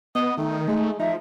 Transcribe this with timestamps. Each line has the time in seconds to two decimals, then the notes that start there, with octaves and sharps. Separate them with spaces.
0.15 B3 D#5
0.37 D#3 A3 D#4
0.68 G#3 A3
0.99 F3 D#4 E5